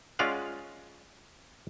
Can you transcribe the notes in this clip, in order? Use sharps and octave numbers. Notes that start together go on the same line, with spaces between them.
G#3 C#4 F4 D5 F5 F#5